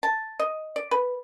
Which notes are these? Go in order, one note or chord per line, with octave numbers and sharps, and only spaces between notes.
A5
D#5
D5
B4